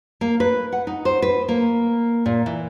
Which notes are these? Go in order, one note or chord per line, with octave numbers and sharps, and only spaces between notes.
A#3
B4
F#5
D#4
C5
B4
A#3
A#2
E3